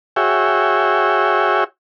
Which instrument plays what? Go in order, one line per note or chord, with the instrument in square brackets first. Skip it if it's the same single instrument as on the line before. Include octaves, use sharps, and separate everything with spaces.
[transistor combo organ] F#4 G#4 C#5 E5 G5